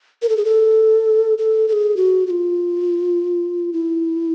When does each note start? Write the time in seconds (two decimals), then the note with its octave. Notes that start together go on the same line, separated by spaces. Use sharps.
0.22 A#4
0.29 A4
0.37 G#4
0.45 A4
1.38 A4
1.68 A4
1.73 G#4
1.97 F#4
2.27 F#4
2.30 F4
3.73 E4